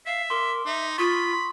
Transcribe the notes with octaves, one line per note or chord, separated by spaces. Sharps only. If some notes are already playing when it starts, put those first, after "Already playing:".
E5 F5
A#4 C6 D6 G7
D#4 E5
F4 B5 C#6 D#6
C6